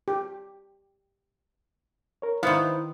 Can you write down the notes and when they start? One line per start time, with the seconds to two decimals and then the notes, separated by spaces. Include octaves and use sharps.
0.08 G4
2.22 A#4 C#5
2.43 D#3 B3 E4 B4 C5 F5